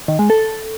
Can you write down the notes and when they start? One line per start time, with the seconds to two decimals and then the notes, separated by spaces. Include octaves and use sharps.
0.08 D#3
0.19 G#3
0.30 A4